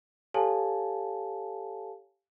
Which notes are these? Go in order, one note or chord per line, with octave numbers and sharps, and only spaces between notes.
G4 A4 C#5 F5 G#5 A5